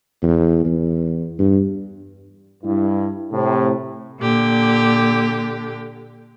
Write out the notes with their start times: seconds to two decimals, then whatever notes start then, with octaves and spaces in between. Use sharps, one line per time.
0.23 E2
0.65 E2
1.39 G2
2.63 G2 E4
3.32 A2 C3
4.19 A#2 D3 G4